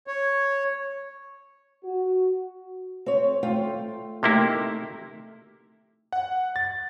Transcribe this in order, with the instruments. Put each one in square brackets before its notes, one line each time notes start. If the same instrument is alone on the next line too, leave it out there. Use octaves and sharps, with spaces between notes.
[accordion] C#5
[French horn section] F#4
[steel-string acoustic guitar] C4 C#5
A3 F4 G5
[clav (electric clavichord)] C3 A#3 E4 [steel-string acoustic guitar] A3 D#4 G4
[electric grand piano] F#5
A6